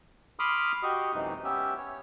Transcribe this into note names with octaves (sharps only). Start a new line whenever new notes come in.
B5 C6 D6 D#6 F6
F#4 G4 D#5 C#6 D#6
F#2 C3 E3 G#3 D#4
B3 C#4 G4 E5
C#5